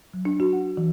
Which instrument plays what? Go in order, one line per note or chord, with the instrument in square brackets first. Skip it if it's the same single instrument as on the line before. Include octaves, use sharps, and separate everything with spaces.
[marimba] F#3
D4
F#4
F#5
E3